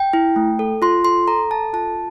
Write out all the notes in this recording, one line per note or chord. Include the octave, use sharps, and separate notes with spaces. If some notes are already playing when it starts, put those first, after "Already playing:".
Already playing: G5
E4
A3
A4
F4 C6
A4 C6
A4 A#5
A4 A5
F4 A5